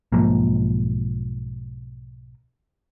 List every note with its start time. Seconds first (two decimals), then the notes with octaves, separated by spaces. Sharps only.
0.12 B1 G#2 F3 A#3